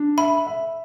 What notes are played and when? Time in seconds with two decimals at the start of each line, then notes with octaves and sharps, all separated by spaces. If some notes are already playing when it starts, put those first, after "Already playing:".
Already playing: D4
0.18 E5 B5
0.47 E5